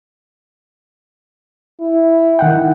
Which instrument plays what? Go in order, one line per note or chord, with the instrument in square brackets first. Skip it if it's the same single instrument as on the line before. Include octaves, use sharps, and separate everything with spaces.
[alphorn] E4
[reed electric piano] D#3 F#5 G5